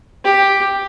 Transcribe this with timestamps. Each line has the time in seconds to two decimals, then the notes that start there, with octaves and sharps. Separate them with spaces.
0.24 G4